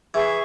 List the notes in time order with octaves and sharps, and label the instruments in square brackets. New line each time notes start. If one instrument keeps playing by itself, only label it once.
[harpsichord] E3 [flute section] G#4 E5 C#6